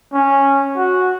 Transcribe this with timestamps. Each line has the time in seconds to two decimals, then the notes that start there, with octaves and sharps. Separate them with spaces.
0.13 C#4
0.76 F#4